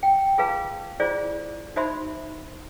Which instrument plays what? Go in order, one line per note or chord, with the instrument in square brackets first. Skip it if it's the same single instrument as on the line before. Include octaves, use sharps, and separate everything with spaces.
[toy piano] G5
F4 G#4 B4 F5 A5
E4 F4 G#4 C5 D5
D#4 F#4 C5 E5 B5 C6